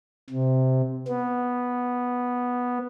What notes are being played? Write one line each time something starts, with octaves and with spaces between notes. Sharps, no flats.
C3
B3